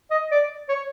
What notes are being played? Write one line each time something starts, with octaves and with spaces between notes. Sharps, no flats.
D#5
D5
C#5